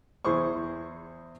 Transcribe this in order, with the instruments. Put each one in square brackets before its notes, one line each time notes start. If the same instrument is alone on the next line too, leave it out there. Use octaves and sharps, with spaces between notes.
[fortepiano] E2 E4 G#4 C5 C#6